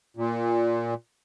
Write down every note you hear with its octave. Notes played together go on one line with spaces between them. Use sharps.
A#2